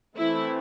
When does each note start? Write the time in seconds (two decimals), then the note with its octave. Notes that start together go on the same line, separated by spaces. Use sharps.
0.16 E3 A3 C4 E4